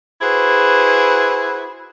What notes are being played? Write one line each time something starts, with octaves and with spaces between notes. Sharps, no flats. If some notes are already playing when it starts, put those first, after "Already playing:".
E4 F#4 G#4 B4 C5